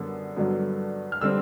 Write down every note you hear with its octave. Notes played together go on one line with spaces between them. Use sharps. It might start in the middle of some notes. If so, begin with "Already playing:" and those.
Already playing: F#2 D3 G3 B3
G2 D3 F#3 B3
F6
D3 G3 C4 E6